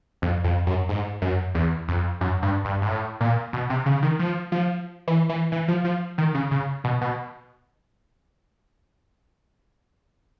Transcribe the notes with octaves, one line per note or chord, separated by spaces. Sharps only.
F2
F2
F#2
G#2
F#2
E2
F2
F#2
G2
G2
G#2
A2
A#2
B2
C3
C#3
D#3
F3
F3
E3
E3
E3
F3
F3
D#3
C#3
C#3
B2
B2